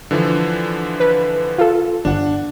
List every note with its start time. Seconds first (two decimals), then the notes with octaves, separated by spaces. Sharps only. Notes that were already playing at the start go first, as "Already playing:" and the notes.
0.11 D3 E3 F3
1.00 B4
1.58 F4 A4
2.05 G1 D4 F#5